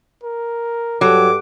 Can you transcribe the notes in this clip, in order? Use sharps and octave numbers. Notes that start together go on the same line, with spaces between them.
A#4
G2 F#3 G4 A4 D6